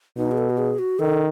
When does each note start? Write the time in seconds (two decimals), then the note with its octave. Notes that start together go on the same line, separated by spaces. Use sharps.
0.17 B2 D#4
0.31 G#4
0.38 A4
0.50 F#4
0.58 G#4
0.79 F#4
0.99 D#3 A4